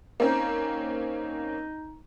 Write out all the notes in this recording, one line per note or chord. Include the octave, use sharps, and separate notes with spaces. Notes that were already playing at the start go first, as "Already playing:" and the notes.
A#3 C4 C#4 D#4